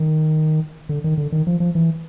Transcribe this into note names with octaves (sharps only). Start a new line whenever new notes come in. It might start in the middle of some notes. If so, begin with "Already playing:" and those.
Already playing: D#3
D3
D#3
D3
D#3
F3
F3
E3